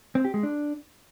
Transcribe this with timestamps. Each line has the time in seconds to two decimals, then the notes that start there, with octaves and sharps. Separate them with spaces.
0.15 C4
0.25 G4
0.34 G#3
0.43 D4